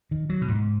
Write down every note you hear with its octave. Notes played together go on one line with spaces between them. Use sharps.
D#3
F#3
B2
G#2